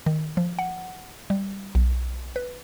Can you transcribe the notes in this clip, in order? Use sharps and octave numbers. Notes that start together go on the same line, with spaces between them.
D#3
F3
F#5
G3
B1
B4